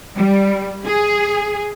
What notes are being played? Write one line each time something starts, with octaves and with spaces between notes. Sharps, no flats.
G3
G#4